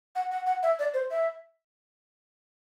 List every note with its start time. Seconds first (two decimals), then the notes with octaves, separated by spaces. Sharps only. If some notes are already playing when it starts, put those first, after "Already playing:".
0.16 F#5
0.31 F#5
0.47 F#5
0.63 E5
0.79 D5
0.94 C5
1.11 E5